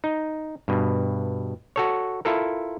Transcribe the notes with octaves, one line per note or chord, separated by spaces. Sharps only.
D#4
G2 B2
F#4 A4 C#5
E4 F4 A4 A#4